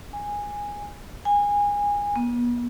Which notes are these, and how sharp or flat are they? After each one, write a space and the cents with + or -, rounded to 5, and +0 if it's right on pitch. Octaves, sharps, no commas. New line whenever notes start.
G#5 -10
G#5 -25
B3 -40